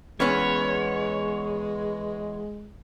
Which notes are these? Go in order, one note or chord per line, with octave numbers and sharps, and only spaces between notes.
E2 E3 G#3 B3 C#4 C#5